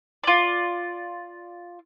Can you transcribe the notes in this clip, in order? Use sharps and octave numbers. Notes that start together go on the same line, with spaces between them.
F4 D5